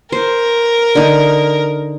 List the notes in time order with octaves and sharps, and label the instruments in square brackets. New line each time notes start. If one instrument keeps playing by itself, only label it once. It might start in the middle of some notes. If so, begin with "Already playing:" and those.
[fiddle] A#4 [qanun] C5
[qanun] D3 D#4